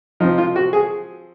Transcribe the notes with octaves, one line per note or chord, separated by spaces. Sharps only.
F3 C4 D#4
F4
F#4
G#4